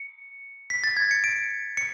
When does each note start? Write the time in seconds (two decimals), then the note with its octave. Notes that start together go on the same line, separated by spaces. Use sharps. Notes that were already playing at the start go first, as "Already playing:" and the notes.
Already playing: C#7
0.70 B6
0.84 A6
0.97 G#6
1.11 C#7
1.24 D7
1.77 C#7